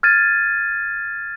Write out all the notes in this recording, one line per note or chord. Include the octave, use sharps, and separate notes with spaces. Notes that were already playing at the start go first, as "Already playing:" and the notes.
F6 G#6 A6 D#7